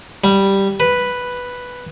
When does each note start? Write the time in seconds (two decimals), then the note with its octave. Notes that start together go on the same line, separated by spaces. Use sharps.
0.24 G3
0.80 B4